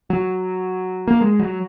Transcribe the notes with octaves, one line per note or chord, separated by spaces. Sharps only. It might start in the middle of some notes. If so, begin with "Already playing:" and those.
F#3
A#3
G#3
F#3